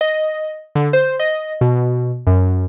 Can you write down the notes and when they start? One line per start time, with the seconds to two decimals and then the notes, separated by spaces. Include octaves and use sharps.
0.01 D#5
0.75 D3
0.93 C5
1.20 D#5
1.61 B2
2.27 F#2